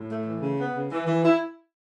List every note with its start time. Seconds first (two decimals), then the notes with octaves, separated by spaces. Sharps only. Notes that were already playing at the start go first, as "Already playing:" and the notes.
Already playing: A2
0.09 A3
0.25 E3
0.42 C#3
0.59 B3
0.74 C#3
0.91 E3
1.07 E3
1.23 E4